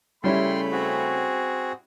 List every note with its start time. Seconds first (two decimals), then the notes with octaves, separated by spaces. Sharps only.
0.24 C#3 G3 A3 C#4 E4 G5 B5 C6
0.72 C4 F#4 G#4